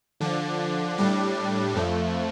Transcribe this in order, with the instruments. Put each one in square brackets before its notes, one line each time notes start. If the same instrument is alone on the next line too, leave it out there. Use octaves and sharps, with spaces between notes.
[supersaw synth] D3 F3 D4
A2 G3 D4
F2 F3 A3